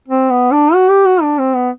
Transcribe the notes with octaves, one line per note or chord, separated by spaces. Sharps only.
C4
B3
D4
F#4
G4
F#4
D4
C4
B3